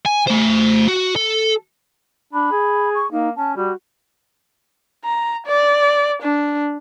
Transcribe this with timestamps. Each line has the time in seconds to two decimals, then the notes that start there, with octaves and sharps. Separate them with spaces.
0.05 G#5
0.27 A3 C5
0.88 F#4
1.16 A4
2.33 D4 B5
2.51 G#4
2.95 C#6
3.12 A#3 D#4
3.36 C#4 A5
3.56 G3 F#4
5.04 A#5
5.46 D5
6.21 D4